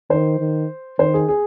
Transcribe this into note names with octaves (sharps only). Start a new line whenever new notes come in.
D#3 C5
D#3
D#3 C5
G#4
G#4